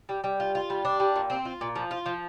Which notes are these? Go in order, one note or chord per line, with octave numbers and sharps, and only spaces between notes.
G3
G3
F4
F4
G3
D4
G3
A#2
C4
F4
A#2
F3
F4
F3